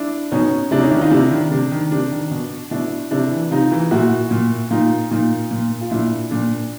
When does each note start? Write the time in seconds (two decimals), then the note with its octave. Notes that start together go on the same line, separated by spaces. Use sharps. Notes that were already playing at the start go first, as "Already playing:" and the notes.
Already playing: D4 E4
0.32 B2 C#4 D#4
0.71 C3 D4 E4
0.81 C#4 D#4
0.91 D#3 D4 E4
1.01 D#4 F4
1.11 C3 D4 E4
1.31 D#3
1.51 C3 D4
1.71 D#3
1.91 C3 D4
2.11 D#3
2.31 B2
2.71 B2 D4 E4
3.11 C3 D4 E4
3.31 E3
3.51 C3 D#4 F4
3.72 E3
3.91 A#2 E4 F#4
4.31 A#2
4.71 A#2 D#4 F4
5.11 A#2 D#4 F4
5.51 A#2
5.81 F4
5.91 A#2 D4 E4
6.31 A#2 D4